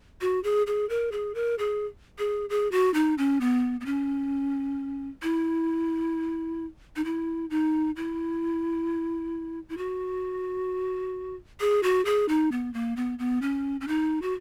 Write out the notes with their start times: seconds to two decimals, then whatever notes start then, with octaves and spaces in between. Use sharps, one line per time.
0.21 F#4
0.44 G#4
0.67 G#4
0.89 A#4
1.12 G#4
1.35 A#4
1.59 G#4
2.18 G#4
2.50 G#4
2.72 F#4
2.94 D#4
3.18 C#4
3.41 B3
3.81 B3
3.86 C#4
5.23 E4
6.96 D#4
7.05 E4
7.50 D#4
7.96 E4
9.69 E4
9.78 F#4
11.60 G#4
11.83 F#4
12.05 G#4
12.29 D#4
12.52 B3
12.74 A#3
12.97 B3
13.19 B3
13.42 C#4
13.81 C#4
13.88 D#4
14.22 F#4